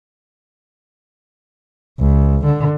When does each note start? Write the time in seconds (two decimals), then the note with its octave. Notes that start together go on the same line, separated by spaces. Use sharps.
2.00 C#2
2.45 D3